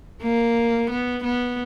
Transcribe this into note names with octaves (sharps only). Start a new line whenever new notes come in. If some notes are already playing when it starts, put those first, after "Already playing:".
A#3
B3
B3